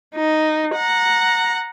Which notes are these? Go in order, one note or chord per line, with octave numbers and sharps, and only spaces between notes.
D#4
F#5 A#5